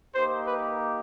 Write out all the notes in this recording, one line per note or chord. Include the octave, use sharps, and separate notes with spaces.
A#3 D#4 G4 C5
B4